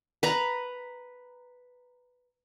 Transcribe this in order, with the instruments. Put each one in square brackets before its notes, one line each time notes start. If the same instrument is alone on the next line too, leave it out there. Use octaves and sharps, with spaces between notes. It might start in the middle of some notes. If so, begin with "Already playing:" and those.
[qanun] B4 A#5